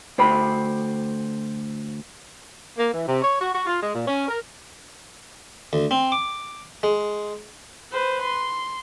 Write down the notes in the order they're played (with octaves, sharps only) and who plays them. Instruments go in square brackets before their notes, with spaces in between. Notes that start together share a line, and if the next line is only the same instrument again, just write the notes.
[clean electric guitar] D2 C5 G5 B5
[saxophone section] A#3
E3
C3
C#5
F#4
F#4
F4
G#3
A#2
C#4
A#4
[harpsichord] D2
C4
D6
G#3
[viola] B4 C5
C6